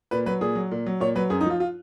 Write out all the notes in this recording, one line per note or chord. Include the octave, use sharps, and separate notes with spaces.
A#2 B4
F#3 B4
A#2 G#4
F#3
A#2
F#3
A#2 C#5
F#3 B4
F#2 G#4
D#4
F3 F4
F4